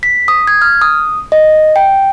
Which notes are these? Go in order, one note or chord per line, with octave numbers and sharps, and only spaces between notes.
B6
D#6
G#6
F6
D#6
D#5
G5